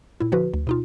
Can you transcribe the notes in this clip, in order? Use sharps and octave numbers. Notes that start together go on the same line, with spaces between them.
A#2 E4
D3 F3 F#4 B4
D2
B2 D#4 F4